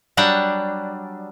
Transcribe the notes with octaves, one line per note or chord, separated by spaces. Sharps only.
F#3 G3 D4 F#5 G5